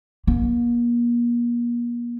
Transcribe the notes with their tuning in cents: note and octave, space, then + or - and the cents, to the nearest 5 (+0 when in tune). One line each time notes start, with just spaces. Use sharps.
A#3 +40